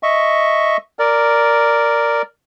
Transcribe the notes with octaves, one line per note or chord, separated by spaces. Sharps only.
D#5 E5 C#6
A#4 D5